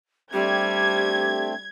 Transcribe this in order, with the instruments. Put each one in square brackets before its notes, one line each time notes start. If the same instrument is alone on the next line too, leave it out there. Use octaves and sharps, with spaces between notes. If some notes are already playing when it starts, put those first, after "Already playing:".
[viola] G3 [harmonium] A3 C4 D4 [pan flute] G4 [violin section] G#6